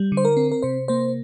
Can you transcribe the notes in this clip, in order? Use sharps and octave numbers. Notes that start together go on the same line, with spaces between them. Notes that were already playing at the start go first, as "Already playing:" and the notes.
Already playing: G3
D3
C5
A#4
C4
A#4
C3 C5
A#3 C5